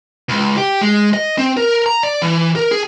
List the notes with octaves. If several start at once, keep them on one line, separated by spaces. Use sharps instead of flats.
C#2
G4
G#3
D#5
C4
A#4
A#5
D5
E3
A#4
G#4